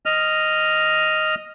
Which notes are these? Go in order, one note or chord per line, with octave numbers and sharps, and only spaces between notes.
D#5 F6